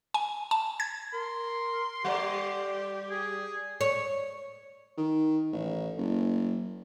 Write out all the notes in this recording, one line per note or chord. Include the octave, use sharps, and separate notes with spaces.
G#5
A5
G#6
A#4 C6
G3 G4 D5
G#4
C#5
D#3
A1
F#1